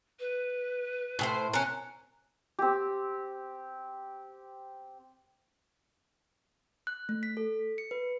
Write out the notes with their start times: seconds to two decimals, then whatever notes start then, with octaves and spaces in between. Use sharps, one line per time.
0.20 B4
1.19 A2 G#4 C5
1.53 C#4 A#4 F#6
2.59 C4 G4
6.87 F#6
7.09 A3
7.23 B6
7.37 A4
7.78 C#7
7.91 B4